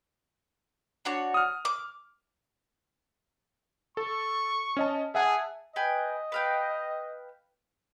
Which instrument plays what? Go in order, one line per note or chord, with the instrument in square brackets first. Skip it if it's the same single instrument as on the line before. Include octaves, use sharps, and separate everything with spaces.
[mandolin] D4 F#4 C#5
[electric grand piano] D#6 F6
[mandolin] D6
[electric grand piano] A4 [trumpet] C#6
[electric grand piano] C#4 D#5 A5
[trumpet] G#4 [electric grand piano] E5 F#5 A5
[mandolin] B4 G5 G#5 [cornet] D#5
[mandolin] B4 F5 G5